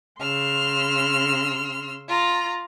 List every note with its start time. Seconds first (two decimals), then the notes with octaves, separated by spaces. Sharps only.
0.21 C#3 C6 E6 F6
2.08 F4 A#5